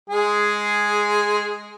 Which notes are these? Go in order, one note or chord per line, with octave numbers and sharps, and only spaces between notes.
G#3 G#4